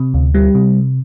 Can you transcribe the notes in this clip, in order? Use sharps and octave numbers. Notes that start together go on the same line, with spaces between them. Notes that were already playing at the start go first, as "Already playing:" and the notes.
Already playing: C3
D2
G3
C3